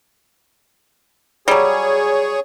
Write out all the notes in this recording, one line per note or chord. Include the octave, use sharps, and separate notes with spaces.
F#3 G3 G#4 C#5